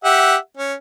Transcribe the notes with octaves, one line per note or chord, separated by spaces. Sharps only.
G4 E5 F#5
C#4